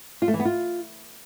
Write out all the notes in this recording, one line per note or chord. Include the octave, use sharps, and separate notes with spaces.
F4
A3
E3
B3
F4